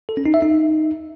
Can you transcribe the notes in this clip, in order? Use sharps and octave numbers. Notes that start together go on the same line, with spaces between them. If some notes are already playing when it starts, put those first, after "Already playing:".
A4
C#4
D#4
E5
D#4